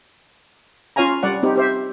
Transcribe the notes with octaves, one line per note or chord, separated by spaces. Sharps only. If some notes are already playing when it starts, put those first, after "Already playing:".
C#4 F4 C#5 F5 G#5 A#5
G3 D5 F#5
C4 D#4 G4
G4 C5 E5